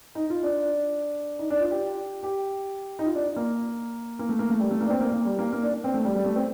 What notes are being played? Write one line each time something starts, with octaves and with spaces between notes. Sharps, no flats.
D#4
F4
D4
D#4
D4
F4
G4
G4
D#4
F4
D4
A#3
A#3
A3
A#3
A3
G3
A3
A#3
D4
C4
A#3
A#3
G3
A#3
A#3
D4
D4
C4
A3
G3
G3
A3
C4